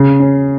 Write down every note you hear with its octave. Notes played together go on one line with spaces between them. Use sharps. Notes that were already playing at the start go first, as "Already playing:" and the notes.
Already playing: C#3
C#4